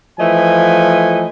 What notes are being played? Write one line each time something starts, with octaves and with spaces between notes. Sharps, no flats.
E3 F3 A3 D#5 G#5